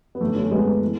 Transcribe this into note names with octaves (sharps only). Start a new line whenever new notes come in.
B3
F#2 D3 A3
A3 C#4
G#3 B3
E3